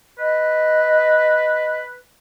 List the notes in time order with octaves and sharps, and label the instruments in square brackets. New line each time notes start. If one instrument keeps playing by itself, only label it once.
[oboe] B4 [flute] D#5